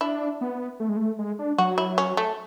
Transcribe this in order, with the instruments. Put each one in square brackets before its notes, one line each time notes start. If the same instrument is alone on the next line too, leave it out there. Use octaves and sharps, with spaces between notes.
[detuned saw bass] D4 [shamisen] E4
[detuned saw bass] B3
A3
G#3
A3
G#3
D4
[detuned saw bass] F#3 [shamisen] F#4
[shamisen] E4
C#4
A3